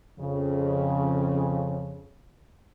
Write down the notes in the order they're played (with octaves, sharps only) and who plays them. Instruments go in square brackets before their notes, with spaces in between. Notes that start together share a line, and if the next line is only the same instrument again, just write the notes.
[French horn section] F2 C#3